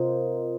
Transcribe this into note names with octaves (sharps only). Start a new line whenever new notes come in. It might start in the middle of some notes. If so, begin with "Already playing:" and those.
Already playing: C3 F4 A#4 C5 D#5